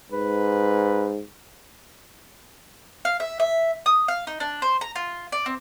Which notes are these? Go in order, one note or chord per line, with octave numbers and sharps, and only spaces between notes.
G#2 B4
F5
E5
E5
D#6
F5
D#4
D4
C5
A#5
F4
D5
C4